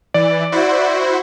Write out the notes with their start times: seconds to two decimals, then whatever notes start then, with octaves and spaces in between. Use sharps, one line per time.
0.14 E3 D5
0.52 E4 F#4 C5